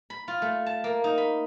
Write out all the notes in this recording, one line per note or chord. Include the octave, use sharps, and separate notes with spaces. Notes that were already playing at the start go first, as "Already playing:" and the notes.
B5
F4
A3
A5
A#3
D#4
B5